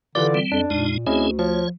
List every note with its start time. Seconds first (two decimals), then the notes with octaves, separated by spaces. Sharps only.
0.15 D3 E3 F4 G4 B4 D5
0.34 G3 C4
0.52 F2 D4
0.70 F2 A#2 G#3 D#4
1.07 D2 C4 C#4 E4 G#4 D#5
1.39 F3 C#5